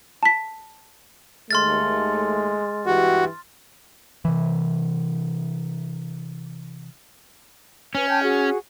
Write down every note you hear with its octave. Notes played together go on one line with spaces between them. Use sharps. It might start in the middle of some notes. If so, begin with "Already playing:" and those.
A5 B6
D#2 G#3 A3 C6 F6 A6
G2 E3 F#4 G4
C3 E3
C#4 B4
G5 A5 G6
F#4 G#4